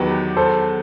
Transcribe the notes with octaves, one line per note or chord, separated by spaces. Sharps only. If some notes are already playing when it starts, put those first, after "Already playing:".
Already playing: E2 D#3 F#3 B3 G4 B4
A4 C5